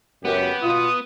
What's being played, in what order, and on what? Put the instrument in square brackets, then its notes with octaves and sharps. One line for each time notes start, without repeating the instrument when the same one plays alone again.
[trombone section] C#2 F#2 [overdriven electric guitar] B3 [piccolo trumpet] G4
[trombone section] B2 F4 [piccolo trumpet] D#6